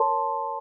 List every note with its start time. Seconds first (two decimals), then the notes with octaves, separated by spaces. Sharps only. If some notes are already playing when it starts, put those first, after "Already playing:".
Already playing: A#4 C#5 A5 C6